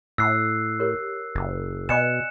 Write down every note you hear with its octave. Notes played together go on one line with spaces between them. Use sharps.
A2 E6 F#6 C7
G4 A#4 C#5
F#1
B2 D5 D#5 G#5 F#6 C#7 E7